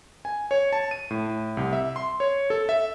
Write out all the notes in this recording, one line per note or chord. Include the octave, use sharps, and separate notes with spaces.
G#5
C#5
A5
D#7
A2
C2
E5
C6
C#5
A4
E5